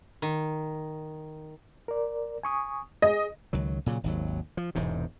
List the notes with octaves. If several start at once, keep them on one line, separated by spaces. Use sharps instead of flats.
D#3
A#4 D5
G#5 C#6 D#6
G#4 D#5
C#2 D#3 F#3
A#2 C#3 F#3
G#1 D#2 F#3
F3
E1 E2 G#2 C3